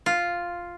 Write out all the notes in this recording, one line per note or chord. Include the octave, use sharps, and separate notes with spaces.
F4